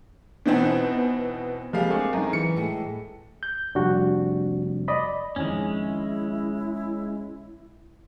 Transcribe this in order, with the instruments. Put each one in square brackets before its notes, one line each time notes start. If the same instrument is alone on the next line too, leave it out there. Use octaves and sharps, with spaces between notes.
[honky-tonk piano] B2 E3 B3 C4 D#4
[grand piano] F3 G3 F5 [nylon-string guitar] G#3 A#3 C4
[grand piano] A3 D4 G#4
F#2 D#3
[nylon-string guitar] E3 [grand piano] C#7
[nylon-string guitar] A2 G#3
[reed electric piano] G6
[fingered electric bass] F1 G3 [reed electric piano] D4 F#4
[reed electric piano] D5 D#5 B5
[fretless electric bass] F2 D#3 [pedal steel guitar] G#3 C#4 [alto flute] E4